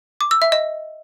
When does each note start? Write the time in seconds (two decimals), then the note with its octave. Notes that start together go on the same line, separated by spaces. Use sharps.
0.21 D6
0.31 E6
0.42 E5
0.52 D#5